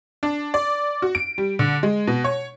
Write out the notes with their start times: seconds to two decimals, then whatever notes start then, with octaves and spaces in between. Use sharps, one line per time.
0.23 D4
0.54 D5
1.02 F#4
1.15 D7
1.38 G3
1.59 D3
1.83 G#3
2.07 B2
2.24 C#5